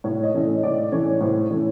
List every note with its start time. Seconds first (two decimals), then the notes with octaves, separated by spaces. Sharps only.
0.04 A2 C#5
0.23 D#5
0.34 E3 A3 C#4
0.43 D#5
0.63 A2 D5
0.92 E3 A3 C#4 C#5
1.21 A2 C5
1.50 E3 A3 C#4 C#5